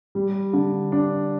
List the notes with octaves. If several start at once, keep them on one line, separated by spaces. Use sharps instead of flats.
G3
D3
D4